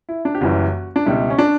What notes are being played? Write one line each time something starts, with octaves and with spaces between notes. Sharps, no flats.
E4
D4
G4
F#1 F#2 E3 G3 F#4
D4
C#2 B2 G3 E4
C#4
D4